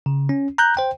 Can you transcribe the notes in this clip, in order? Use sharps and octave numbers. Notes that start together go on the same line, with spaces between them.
C#3
C#4
A#5 F#6 G6
C5 G5